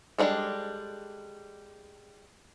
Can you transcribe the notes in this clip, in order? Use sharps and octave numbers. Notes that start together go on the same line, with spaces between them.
G3 G#3 C4 D4 A4